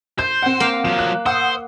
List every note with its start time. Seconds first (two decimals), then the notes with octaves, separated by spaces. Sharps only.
0.19 C5 G6
0.43 C4 F#5
0.60 A#3 F5
0.85 F3 F#3 E7
0.99 F#6
1.26 C5 F#5 D#6 E6